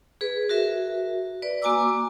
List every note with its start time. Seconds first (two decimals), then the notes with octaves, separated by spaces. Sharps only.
0.21 G#4 B4
0.49 F#4 A#4 E5
1.42 B4 D5
1.62 A#3 F#4 G#5 A#5 D6 E6